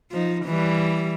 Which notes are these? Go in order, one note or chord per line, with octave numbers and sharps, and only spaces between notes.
F3 D#4
E3 G3